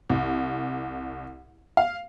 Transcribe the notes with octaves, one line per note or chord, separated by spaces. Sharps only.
C2
F5